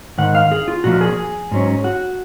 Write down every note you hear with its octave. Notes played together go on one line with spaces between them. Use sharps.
G#2 D#3 F#5
F5
G#4
F4
A#2 F3 A#3 F#4
G#4
G#2 F#3 C#4
F#4